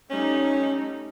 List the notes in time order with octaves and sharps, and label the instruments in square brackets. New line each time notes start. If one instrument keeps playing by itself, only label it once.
[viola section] G3 A3 D#4 [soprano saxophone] C#4